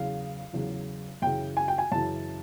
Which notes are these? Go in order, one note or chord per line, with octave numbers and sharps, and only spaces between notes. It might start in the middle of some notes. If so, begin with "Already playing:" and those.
Already playing: E2 C#3 F#3 F5
E2 C#3 F#3
F#2 C#3 E3 G5
G#5
G5
G#5
F#2 C#3 E3 A5